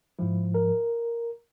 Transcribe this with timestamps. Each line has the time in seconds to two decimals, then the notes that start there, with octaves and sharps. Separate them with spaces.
0.19 G#2 F3 E4
0.54 A#4